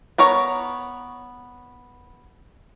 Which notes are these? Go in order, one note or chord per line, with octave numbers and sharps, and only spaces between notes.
B3 A#4 C#5 A#5